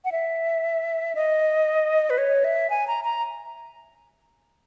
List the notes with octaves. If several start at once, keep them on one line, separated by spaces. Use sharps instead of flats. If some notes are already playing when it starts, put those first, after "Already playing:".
F#5
E5
D#5
B4
C#5
E5
G#5
A#5
A#5